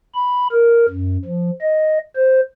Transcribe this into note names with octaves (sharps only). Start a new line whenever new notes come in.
B5
A#4
F#2
F3
D#5
C5